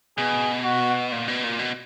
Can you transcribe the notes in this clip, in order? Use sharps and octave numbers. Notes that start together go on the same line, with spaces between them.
B2 G#4
F#4
A#2
B2
A#2
B2